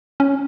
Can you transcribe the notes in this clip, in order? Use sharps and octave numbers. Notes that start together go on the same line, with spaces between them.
C#4